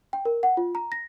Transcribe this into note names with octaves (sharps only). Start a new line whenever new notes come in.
G5
A#4
F#5
F4
A#5
A#6